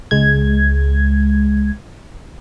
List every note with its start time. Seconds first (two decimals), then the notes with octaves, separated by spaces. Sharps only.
0.11 C#2 G#3 G#6